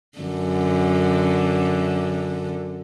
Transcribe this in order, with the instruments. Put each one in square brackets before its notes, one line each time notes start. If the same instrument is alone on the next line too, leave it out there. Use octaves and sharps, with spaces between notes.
[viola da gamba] F#2 D3